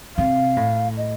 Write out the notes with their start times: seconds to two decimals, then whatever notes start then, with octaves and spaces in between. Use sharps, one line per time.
0.17 C3 F5
0.57 A2
0.97 D#5